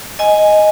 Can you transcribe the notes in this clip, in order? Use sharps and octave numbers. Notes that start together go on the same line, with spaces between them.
D#5 G#5